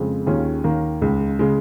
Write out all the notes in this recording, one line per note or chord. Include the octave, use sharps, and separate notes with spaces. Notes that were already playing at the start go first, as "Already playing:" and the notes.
Already playing: F2 C#3 G#3
D#2 D#3 C#4 F4 G#4
D#2 D#3 A#3
C#2 C#3 G#3
C#3 G#3